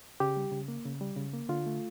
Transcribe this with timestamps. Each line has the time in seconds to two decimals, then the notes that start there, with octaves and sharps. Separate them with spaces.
0.20 C#3 G4
0.36 G3
0.52 C#3
0.68 A#3
0.85 C#3
1.01 G3
1.16 C#3
1.33 A#3
1.49 D3 F4
1.66 A3